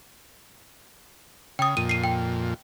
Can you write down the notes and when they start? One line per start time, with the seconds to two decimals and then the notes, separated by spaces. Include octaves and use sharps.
1.59 C#3 G5 D#6
1.77 F2 A#2 D#7
1.89 C7 D#7
2.04 G5